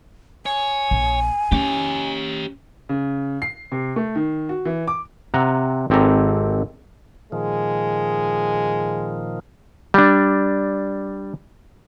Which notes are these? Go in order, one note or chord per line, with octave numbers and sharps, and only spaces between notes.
C#5 G#5
A#1
C#4 G4 C#5
C#3
C7
C3
A3
D#3
F#4
E3
D6
C3 F#5 A#5
G#1 C4 G4 A4 A#5
A#2 D#3 F3 G#3
G3 D4